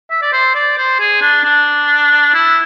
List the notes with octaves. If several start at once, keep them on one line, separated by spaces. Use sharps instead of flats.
E5
D5
C5
D5
C5
G#4
D4
D4
E4